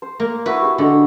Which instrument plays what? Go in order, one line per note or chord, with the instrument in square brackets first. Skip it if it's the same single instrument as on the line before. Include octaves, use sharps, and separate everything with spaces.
[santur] C5
[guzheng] A#3
[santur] E4 F#4 C#6 [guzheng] B4
[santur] G4 G#4
[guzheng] D3 [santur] G#3 F#4